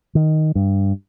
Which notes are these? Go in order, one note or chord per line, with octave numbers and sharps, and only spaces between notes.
D#3
G2